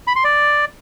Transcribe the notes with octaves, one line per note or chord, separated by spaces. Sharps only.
B5
C6
D5